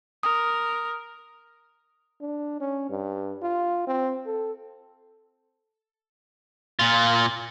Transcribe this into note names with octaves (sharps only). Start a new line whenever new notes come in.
A#4 D#6
D4
C#4
G2
F4
C4
A4
A#2 F4